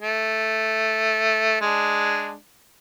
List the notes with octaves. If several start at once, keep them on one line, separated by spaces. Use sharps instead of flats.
A3
G#3 D4